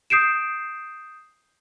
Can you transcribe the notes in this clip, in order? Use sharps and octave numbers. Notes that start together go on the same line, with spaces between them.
D#6 G6 C7 D7 E7